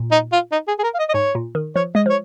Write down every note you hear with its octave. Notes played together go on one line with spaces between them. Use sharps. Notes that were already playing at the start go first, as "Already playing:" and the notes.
Already playing: A#2
D#4
F4
D#4
G#4
G#4
A#4
F5
D#5
D#5
G#2 C#5
A#2
D#3
F3 C#5
G#3 D#5
F3 C#5